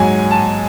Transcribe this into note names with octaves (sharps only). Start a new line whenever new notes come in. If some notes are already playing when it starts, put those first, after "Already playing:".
Already playing: G#2 F#3 G#5
A5